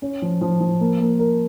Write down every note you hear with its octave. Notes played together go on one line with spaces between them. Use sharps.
C#4
F3
F3
F3
A#3
A#3
A#4